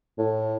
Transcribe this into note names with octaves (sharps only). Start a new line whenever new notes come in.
A2